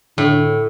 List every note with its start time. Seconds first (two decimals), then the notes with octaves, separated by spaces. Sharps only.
0.18 A2 D3